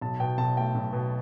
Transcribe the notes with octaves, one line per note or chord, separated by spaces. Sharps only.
B1 A5
B2 G5
B1 A5
A3 G5
B1
B2